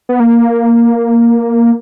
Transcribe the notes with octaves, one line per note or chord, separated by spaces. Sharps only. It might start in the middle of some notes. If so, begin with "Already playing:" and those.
B3
A#3